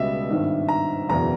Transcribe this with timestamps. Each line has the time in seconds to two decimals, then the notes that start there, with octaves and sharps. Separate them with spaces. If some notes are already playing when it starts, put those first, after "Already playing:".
Already playing: C#2 B2 G3 B3 D#5 E5
0.30 G#1 G2 D#3
0.69 A#5
1.09 F#1 E2 B2 A#5